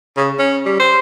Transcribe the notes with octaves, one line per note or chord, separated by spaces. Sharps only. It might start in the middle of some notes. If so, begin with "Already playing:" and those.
C#3
C#4
G3
C5